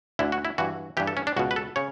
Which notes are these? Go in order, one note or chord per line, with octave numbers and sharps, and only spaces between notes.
D2 D3 E4
F#4
E4
G2 E3 F#4
G2 E3 G4
A4
C#4
D4
C#2 B2 F#4
B4
A4
C#3 C#5